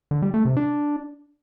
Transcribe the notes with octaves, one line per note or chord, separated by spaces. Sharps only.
D3
G3
A3
C3
D4